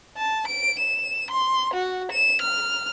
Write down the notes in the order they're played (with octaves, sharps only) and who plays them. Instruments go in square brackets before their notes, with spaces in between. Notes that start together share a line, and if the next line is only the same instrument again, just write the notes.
[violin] A5
D7
E7
C6
F#4
E7
F6